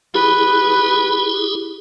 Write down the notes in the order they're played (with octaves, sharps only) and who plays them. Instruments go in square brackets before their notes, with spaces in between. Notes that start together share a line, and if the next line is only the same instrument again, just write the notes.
[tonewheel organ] E4 G4 G#4 [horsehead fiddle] B4